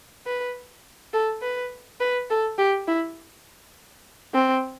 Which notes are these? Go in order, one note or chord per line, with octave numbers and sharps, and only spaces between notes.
B4
A4
B4
B4
A4
G4
E4
C4